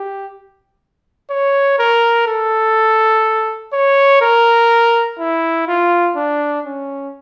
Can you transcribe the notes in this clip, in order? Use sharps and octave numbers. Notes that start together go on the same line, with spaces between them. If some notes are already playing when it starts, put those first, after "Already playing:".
Already playing: G4
C#5
A#4
A4
C#5
A#4
E4
F4
D4
C#4